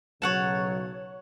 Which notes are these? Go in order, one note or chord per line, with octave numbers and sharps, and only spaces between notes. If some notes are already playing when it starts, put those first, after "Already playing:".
B1 C#3 F#3 C#5 F#5 A5